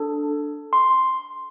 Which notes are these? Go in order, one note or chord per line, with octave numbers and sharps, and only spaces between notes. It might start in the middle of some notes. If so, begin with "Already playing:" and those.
Already playing: D4 A4
C6